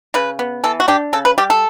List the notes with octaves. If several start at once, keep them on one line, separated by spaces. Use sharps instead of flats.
C#3 B4
B3
E3 A4
F#4
D4 G4
C#3 A4
B4
G3 G4
A4